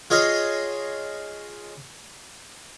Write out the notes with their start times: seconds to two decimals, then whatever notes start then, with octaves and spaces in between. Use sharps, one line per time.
0.10 F4 G#4 C#5 D#5 F5